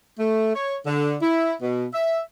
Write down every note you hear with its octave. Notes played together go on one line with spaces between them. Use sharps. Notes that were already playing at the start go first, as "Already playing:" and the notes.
A3
C#5
D3
E4
B2
E5